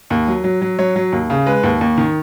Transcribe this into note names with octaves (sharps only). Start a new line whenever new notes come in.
D#2
F#3
F#3
F#3
F#3 C#5
F#3
D#2
C#3
G#3 B4
D#2
D#2
D#3